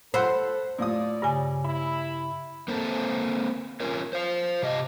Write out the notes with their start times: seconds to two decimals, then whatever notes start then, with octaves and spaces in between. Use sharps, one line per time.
0.14 A4 C5 F#5 B5 E6
0.79 A2 F4 D5 D#6
1.22 G2 C#3 G#5
1.65 E4
2.68 A#3 C4 D4 A4
3.80 C#4 F4 A#4 C#5
4.13 C5 F5
4.62 C3 G4 D#5